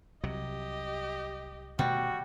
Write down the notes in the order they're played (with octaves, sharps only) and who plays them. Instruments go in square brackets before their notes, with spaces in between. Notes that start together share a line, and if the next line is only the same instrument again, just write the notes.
[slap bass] C2 C3 F#3 [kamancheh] G4 D#5
[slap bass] B2 D#3 A3 [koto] G3 [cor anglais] F#4